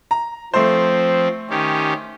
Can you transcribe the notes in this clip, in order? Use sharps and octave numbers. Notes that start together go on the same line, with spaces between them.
A#5
F3 A3 C4 C5
D#3 C#4 G4